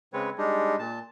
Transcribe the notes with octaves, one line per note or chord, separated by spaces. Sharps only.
C#3 G#3 C4 B4 C#5
G3 G#3 D4 D#4
A#2 A5